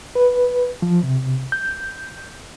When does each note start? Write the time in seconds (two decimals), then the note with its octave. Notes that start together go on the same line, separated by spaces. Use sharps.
0.15 B4
0.82 F3
1.03 C3
1.52 G6